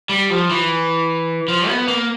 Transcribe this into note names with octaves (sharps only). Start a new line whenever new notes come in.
G3
F3
E3
F3
B3
A#3